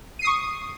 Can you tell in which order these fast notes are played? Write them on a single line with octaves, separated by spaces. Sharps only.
D#7 C7 D#6 C#6